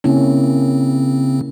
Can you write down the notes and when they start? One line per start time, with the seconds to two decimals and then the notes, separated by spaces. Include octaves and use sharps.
0.04 C#3 A#3 C4 C#4 E4